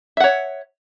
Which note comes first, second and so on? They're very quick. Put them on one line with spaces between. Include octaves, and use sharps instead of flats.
E5 F#5 C#5